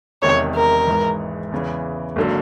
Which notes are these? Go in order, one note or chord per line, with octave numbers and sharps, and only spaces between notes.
E1 E2 C3 D#3 C#5
A#4
G#1 G#2 E3
E2 C#3 E3
G#1 D3 F#3 A#3